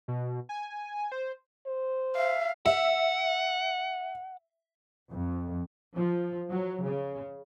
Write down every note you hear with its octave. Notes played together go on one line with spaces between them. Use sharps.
B2
G#5
C5
C5
E5 F5
E5 F#5
F2
F3
F#3
C#3